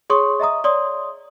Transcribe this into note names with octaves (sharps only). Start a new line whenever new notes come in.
G#4 C#5 C6 C#6 D#6
D#5 E5 A#5 D#6
C#5 D5 C6 D#6